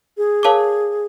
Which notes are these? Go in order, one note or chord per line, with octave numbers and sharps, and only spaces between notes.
G#4
A#4 C#5 F5 A5 D6